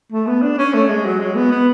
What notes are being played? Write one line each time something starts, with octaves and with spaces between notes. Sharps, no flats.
A3
B3
D4
C#4
A3
G#3
F#3
G#3
B3
B3